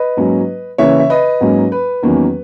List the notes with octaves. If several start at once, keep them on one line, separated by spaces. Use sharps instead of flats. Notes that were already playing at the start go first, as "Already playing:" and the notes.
Already playing: B4 D#5
G#2 F#3 A#3 C#4
C#3 E3 A#3 C#4 C#5 E5
E5
B4 D#5
G#2 F#3 A#3 C#4
B4
E2 D#3 F#3 A#3 C#4